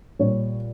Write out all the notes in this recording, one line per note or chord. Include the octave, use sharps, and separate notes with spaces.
A#2 G3 C#5